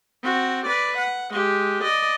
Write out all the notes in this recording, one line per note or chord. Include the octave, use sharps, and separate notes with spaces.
C4 F#4
B4 D5
F#5
G#3 G4
D5 D#5